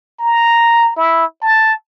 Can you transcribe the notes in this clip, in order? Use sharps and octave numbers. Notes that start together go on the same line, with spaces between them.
A#5
E4
A5